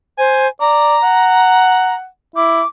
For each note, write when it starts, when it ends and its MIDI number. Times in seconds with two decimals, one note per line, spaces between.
0.18 0.47 72
0.18 0.48 80
0.61 0.98 74
0.61 1.95 82
1.04 2.07 78
2.36 2.62 64
2.36 2.67 86